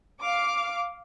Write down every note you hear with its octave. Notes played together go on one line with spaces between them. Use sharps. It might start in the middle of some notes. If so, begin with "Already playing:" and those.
F5 D6